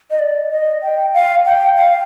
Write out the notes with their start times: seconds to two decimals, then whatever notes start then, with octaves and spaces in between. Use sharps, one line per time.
0.11 D#5
0.19 D5
0.51 D#5
0.82 G5
1.14 F5
1.46 G5
1.77 F5